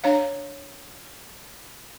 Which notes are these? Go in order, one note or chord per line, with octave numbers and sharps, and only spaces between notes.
D4 C#5 F5